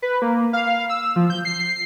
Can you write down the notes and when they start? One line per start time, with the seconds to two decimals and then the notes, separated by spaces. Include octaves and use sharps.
0.02 B4
0.22 A#3
0.53 F5
0.90 E6
1.16 F3
1.30 G6
1.45 C7